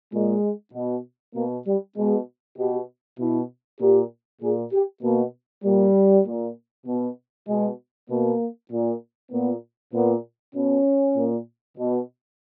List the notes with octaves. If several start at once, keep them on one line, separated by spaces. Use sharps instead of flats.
A#2 G#3
B2
B2 A#3
G3
B2 G#3
B2 G4
B2 E4
A#2 G4
A#2 G#4
G4
B2 A#3
A#2 G3
A#2
B2
B2 G#3
B2 A#3
A#2
A#2 B3
A#2 B3
B2 C#4
A#2
B2